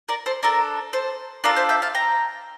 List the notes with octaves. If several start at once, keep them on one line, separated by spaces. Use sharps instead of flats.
A#4 D5
A4 C5
D4 A4 A#4
A4 C5
D4 F4 A4 A#4 D5
C5 E5
E5 G5
F5 A5
G5 A#5